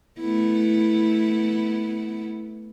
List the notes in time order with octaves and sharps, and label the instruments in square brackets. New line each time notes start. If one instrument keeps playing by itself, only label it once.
[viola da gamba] A3 B3 E4